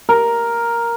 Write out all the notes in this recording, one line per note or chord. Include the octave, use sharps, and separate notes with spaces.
A#4